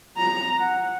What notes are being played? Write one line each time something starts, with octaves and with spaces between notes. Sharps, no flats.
A#5
F#5